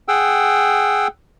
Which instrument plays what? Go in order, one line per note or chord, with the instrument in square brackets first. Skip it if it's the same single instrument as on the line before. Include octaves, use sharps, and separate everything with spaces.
[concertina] G#4 F#5 G5 E6